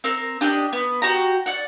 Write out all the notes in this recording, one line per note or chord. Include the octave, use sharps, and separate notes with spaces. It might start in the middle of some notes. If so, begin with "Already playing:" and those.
C4 A#4
D4 G4 D#5
B3
F#4 G4 A#5
D5 F#5